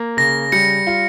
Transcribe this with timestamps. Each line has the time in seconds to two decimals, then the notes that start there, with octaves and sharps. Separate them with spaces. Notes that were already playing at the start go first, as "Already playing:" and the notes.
Already playing: A#3
0.17 C#3 A#6
0.52 G3 C#7
0.87 F4